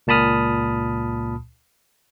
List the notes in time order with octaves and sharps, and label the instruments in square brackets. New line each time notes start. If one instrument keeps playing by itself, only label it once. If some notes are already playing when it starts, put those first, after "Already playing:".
[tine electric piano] C#2 A#2 A5 B5 D#6 F6